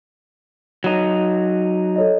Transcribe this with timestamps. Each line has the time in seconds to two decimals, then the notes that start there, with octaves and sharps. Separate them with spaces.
0.84 F#3 D#4
1.96 A4 C#5 D#5